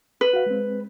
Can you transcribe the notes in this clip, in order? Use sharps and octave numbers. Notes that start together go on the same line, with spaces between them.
B4
F#4 F5
G#3 C4